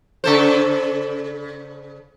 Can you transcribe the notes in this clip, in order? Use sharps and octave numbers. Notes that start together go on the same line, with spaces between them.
C#3 A4 C5